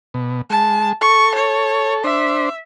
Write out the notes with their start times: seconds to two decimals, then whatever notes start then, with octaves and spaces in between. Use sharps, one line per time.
0.14 B2
0.50 G#3 A5
1.01 A4 C#6
1.35 C#5
2.04 D4 C5 E5